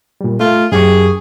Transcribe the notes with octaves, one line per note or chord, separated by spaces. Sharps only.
A#2 G3
A3 F4
F#2 G4 G#4 C#6